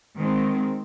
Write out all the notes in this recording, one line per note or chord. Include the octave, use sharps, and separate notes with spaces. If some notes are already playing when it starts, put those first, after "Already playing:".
D#3 G#3 C4